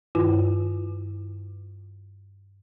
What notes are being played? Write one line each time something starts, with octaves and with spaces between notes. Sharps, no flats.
G2 D#3 E4 F4 B4